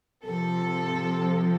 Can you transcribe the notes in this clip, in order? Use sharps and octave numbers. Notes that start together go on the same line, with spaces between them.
C3 F3 A4